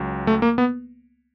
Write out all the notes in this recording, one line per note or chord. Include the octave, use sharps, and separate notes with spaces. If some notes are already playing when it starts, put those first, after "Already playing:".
Already playing: C#2 F#3
A3
A#3
B3